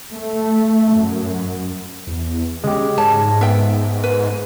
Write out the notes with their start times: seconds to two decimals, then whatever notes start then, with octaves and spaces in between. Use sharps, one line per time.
0.12 A3
0.94 F#2
2.07 E2
2.64 C#3 G#3 G4
2.98 G#2 C#5 A5
3.41 B3 E5 G5
4.04 B4